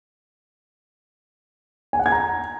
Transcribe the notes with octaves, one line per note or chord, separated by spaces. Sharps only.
G#5
F#5
G#6
A#5